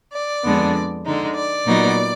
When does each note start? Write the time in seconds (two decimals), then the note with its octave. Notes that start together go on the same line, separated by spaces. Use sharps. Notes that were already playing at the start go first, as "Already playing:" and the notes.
0.14 D5
0.44 F2 D3 G#3 B3 D4
1.05 D3 G#3 D#4
1.35 D5
1.65 A#2 F#3 B3 D#4